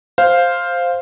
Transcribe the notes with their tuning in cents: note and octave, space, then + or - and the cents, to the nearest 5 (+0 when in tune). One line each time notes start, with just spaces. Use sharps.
C5 +0 F5 +0